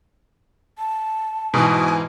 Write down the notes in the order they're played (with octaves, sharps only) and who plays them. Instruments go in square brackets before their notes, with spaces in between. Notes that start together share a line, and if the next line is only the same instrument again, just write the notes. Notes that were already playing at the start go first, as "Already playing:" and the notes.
[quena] A5
[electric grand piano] G#2 E3 [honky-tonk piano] B2 [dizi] G#5